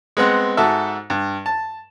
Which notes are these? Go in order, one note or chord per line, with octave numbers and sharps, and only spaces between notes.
G#3 B3 C4 F#5
G#2 F#4 A4 E5
G2
A5